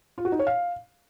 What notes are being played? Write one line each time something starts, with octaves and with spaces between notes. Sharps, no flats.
F4
F#4
D#4
C#5
F5